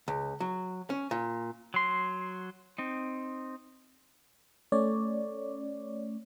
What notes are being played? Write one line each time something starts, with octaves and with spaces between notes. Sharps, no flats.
C#2
F#3
C#4
A#2
F#3 C6
C4 D#4
A3 C#4 C#5 D5